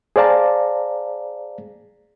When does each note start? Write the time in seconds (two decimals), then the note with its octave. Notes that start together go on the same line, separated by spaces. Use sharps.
0.16 G#4 C5 D5 F5 A5 A#5